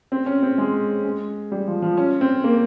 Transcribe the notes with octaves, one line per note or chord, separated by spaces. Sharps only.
C4
C#4
C4
G#3
G#3
G3
F3
F3
C#4
C4
A#3